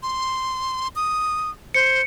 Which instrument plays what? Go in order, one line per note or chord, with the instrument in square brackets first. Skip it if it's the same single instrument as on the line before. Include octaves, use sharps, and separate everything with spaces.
[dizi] C6
D#6
[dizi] C5 [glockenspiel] C#7